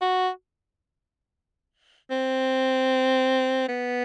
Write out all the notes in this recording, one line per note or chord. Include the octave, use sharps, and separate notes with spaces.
F#4
C4
B3